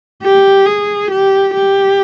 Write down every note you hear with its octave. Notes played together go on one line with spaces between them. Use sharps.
G4
G#4
G4
G4